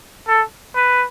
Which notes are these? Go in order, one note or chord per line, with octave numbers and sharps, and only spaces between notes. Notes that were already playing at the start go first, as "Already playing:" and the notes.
A4
B4